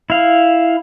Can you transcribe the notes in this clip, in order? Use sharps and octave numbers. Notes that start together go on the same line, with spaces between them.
E4 F5